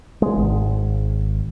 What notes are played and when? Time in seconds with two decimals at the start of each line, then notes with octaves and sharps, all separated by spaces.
0.22 G#3
0.37 G#1